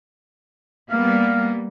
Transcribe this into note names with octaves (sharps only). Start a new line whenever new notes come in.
G3 A#3 B3 F5